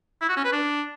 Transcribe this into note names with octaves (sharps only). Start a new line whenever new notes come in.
E4
F#4
C#4
B4
D4